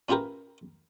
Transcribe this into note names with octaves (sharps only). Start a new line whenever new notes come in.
C#4 E4 F4 G4 A#4 B4